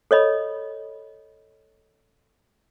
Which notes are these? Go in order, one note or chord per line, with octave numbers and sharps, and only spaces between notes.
A4 C#5 D#5 B5